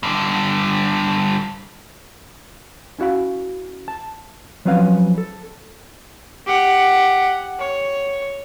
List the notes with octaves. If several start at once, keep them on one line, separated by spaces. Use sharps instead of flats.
G2 D3
C#4 E4 F#4 F5 B5
A5
F3 F#3 C4 C#4 B4 F5
A4
G4 F#5
C#5